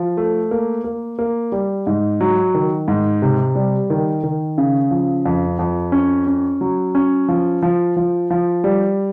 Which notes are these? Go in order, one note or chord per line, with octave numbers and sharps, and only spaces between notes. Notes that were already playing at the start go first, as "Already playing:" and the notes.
Already playing: F3
A3
A#3
A#3
A#3
G3
G#2
F#3
D#3
G#2
C3
G3
D#3
D#3
C#3
F3
F2
F2
C#4
C#4
F#3
C#4
F3
F3
F3
F3
G3